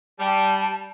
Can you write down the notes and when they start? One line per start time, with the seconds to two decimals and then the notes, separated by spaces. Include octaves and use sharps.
0.19 G3 A5